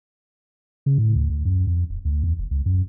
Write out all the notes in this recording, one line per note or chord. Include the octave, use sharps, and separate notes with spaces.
C#3
A2
D2
D2
F#2
F2
D1
D2
E2
E1
C#2
F#2